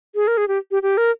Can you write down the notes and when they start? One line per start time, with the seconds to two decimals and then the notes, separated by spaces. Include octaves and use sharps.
0.15 G#4
0.27 A#4
0.37 G#4
0.48 G4
0.71 G4
0.83 G4
0.97 A#4